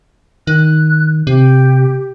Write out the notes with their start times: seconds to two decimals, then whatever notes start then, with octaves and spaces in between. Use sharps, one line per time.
0.47 D#3 F#6
1.27 C3 G4